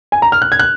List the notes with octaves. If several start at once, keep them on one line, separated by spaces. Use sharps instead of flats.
G#5
A#5
F6
F#6
G#6
F#6